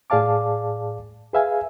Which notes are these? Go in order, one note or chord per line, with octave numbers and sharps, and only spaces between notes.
A2 G#4 D5 F5 A5 D6
G#4 B4 E5 F5 G#5